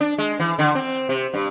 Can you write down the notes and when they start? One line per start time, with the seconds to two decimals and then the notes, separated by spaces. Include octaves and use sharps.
0.01 D4
0.18 G#3
0.40 E3
0.59 D3
0.75 C4
1.09 C3
1.34 G2